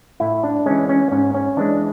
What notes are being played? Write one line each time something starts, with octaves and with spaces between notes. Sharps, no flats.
A2 E4
D4
E3 G#3 C#4
C#4
G#2 C#4
C#4
E3 G#3 D4